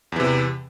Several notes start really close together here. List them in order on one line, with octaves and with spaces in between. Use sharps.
E2 E3 C3